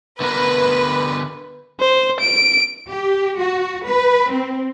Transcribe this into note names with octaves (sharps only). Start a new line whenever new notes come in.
D3 B3 A#4 B4
C5
D7
G4
F#4
B4
C4